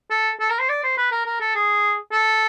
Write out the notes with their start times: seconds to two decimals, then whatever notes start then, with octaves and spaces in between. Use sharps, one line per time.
0.10 A4
0.40 A4
0.50 A#4
0.59 C5
0.69 D5
0.83 C5
0.97 B4
1.11 A#4
1.26 A#4
1.40 A4
1.55 G#4
2.12 A4